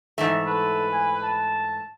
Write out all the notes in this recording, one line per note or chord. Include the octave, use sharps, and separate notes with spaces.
G#2 E3 A3
A4 B4
G#5
A5